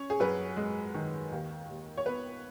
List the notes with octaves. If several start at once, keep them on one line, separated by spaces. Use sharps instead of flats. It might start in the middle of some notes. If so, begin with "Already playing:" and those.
Already playing: C#4 C#5
G#4
F#2 B4
G#3
D#3
D#2
D#2
C#5
B3 B4